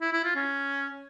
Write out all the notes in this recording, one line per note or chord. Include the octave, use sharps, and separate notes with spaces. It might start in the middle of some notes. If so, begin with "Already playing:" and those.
E4
E4
F4
C#4